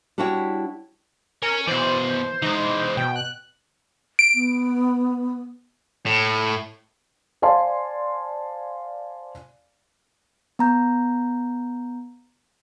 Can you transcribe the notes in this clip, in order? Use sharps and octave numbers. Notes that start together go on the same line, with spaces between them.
G3 D4 E4 F#4 C#5 G5
A#4 C#5 G#5
B2 E3 C5 D5
E3 G#3 D#4
B2 G5
F#6
D7
B3
A2
C5 D5 F5 G#5 A5 C6
B3 A#5 G6